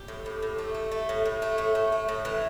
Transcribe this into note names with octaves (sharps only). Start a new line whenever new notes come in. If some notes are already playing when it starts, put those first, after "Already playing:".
Already playing: G4
A2
A2
A2
A3
A3
A3
A2
A2
A3
A2
A3
A3
A2
E3